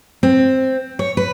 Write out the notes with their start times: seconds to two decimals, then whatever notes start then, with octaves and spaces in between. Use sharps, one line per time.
0.23 C4
0.99 C#5
1.17 B4